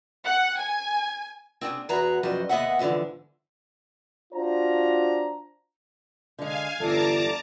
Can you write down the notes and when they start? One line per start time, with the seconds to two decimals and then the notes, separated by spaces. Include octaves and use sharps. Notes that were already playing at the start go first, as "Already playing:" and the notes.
0.25 F#5
0.58 G#5
1.61 C4 D4 F#4 G#4
1.89 E2 F#4 G#4 B4 A#5
2.23 F#2 F3 G3 F#4 C5 D#5
2.49 D#2 B3 G#4 D#5 E5 F#5
2.79 D#2 G#2 D3 E3 F3
4.34 D4 F4 F#4 C5 A#5
6.38 D3 G#3 F5 G#5
6.80 G1 E2 D4 A4 A5 A#5 D6